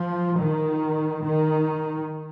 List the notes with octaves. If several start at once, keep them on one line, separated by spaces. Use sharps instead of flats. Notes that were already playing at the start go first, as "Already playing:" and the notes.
Already playing: F3
D#3
D#3